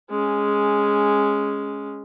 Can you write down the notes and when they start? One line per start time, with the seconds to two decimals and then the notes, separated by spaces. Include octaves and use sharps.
0.10 G#3 C#4